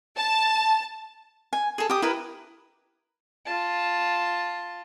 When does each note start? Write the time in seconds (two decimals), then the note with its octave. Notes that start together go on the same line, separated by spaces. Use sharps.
0.16 A5
1.53 G#5
1.78 G#4 A4
1.90 G4 D#6
2.02 E4 A#4 B4
3.46 F4 A5